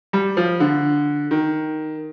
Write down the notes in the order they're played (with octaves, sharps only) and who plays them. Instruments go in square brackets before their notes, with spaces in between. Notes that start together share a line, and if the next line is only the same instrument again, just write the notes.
[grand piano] G3
F3
D3
D#3